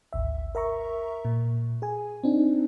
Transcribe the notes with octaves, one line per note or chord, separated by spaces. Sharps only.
G#1 D2 E5
A#4 E5 A#5 C#6
A#2
G#4 G#5
C4 D4 D#4